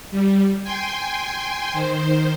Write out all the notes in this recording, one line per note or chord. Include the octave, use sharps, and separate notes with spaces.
G3
G5 G#5 C6
D#3 C5